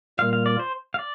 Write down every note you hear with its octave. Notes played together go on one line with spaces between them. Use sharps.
A#2 G3 A#3 F4 A#4 F5
F5
D5
C5
F5
D5